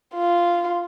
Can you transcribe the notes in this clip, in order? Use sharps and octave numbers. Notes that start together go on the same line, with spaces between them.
F4